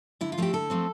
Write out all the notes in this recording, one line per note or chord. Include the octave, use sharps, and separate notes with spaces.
D3 E4
F4
F3 A3 C4 G4
D3 A4
F3 A3 C4